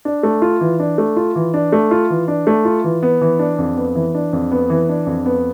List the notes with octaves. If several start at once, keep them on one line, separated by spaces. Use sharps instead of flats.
D4
A3
F4
E3
D4
A3
F4
E3
D4
A3
F4
E3
D4
A3
F4
E3
B3
E3
D4
F2
B3
E3
D4
F2
B3
E3
D4
F2
B3